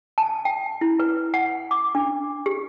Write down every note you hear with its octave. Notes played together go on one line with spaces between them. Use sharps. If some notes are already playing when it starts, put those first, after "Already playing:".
A5
G5
E4
B4
F#5
D6
D4
G4